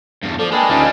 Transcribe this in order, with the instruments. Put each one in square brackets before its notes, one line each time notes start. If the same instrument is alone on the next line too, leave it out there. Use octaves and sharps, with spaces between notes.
[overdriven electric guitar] E2 G2
[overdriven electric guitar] F3 [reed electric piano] A4 [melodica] D5
[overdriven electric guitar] G#3 [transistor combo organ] A#3 A4 [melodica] D4 B4 [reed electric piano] G5 G#5
[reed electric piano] D2 C#4 G#5 [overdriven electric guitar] G3 G#3 [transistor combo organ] D#4 F4 A4